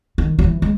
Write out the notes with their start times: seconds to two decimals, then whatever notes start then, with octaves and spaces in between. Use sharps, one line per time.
0.18 D#3
0.39 F#3
0.44 E3
0.62 G#3